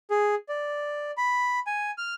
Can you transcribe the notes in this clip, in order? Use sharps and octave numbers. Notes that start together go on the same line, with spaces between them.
G#4
D5
B5
G#5
F6